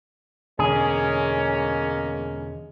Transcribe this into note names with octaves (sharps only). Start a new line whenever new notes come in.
E2 B2 D3 G#3 A#3 C#4 G#4